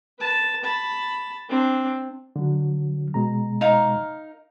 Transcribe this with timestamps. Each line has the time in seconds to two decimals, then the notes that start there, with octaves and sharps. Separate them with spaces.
0.19 B4 A5
0.64 A5 B5
1.49 C4 D4
2.36 D3 F#3
3.14 B2 G#3 A#5
3.61 D#4 A#4 F5